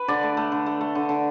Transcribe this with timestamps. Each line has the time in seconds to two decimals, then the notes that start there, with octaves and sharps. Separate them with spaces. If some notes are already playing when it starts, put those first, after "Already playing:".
Already playing: B4
0.08 D3 D5
0.23 A3
0.37 A3
0.52 D3
0.66 A3
0.81 A3
0.95 D3
1.09 D3